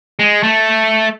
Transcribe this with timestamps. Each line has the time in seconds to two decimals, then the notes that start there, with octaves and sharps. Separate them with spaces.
0.19 G#3
0.43 A3